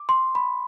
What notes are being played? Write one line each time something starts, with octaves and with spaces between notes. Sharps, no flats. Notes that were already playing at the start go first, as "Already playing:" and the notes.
Already playing: D6
C6
B5